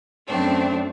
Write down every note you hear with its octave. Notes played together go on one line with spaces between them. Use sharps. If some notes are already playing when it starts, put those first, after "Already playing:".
F#2 A3 C4 D4